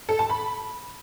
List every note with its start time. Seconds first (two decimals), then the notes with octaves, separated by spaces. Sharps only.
0.09 A4
0.19 A5
0.29 B5